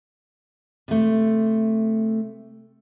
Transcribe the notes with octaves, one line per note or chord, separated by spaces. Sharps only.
C3 A3